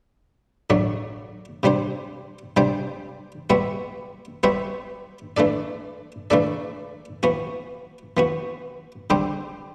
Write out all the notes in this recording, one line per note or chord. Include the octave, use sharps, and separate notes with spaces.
A2 F#3 A3 D4
C3 G3 D4 G4 C5
C3 G3 D4 G4 C5
G3 B3 F#4 C5 E5
G3 B3 F#4 C5 E5
E3 A3 D4 A4 D5
E3 A3 D4 A4 D5
E3 B3 F#4
E3 B3 F#4
D3 G3 C4 G4 C5